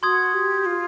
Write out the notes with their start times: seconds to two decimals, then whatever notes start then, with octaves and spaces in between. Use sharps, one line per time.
0.03 F#4 C6 D#6 G#6
0.34 G4
0.66 F4